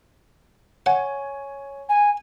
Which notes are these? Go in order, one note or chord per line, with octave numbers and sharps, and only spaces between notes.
C#5 F#5 G#5
G#5